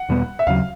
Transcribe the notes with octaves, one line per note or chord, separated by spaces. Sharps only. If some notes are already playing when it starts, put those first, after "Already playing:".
Already playing: F#5
E2 B2 G3 B3
E5
D#2 C#3 F#3 F5